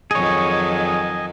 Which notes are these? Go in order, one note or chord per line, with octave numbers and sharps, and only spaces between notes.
F2 D#3 F#3 G#4 C#5 D#5 G#5